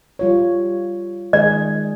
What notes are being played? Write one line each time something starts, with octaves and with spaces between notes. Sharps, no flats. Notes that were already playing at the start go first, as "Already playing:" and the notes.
G3 F4 C#5
D#3 G#3 G#4 D5